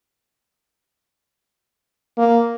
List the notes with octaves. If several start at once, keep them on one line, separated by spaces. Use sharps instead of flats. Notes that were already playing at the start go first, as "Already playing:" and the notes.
A#3